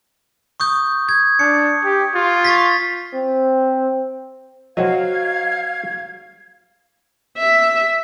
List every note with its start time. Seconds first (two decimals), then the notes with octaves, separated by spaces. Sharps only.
0.60 C#6 D#6 G6
1.09 G#6
1.39 D4 C#7
1.84 G4
2.15 F4
2.45 C#6 A6 B6
3.14 C4
4.77 F#3 F#4 C5 D#5 F5 G#6
7.38 E5